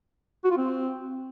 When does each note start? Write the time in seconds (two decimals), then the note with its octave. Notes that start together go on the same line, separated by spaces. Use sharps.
0.44 F#4
0.51 F4
0.57 C4